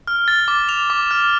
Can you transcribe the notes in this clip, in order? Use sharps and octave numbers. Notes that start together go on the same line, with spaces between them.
F6
A6
D6
F7
D6
F6